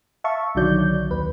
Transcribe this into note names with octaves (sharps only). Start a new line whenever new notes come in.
E5 F5 A5 C#6
B1 D3 D#3 F#3 D5 G6
D#2 B4